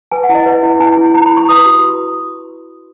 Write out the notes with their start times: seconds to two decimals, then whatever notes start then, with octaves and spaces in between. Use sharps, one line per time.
0.11 B4 G#5
0.23 F#5
0.29 E4
0.35 D#5
0.46 B4 E5
0.63 E4
0.80 E4 G#5
0.97 E4
1.14 E4 A#5
1.26 B5
1.31 E4
1.37 C#6
1.48 B4 D#6
1.66 F#4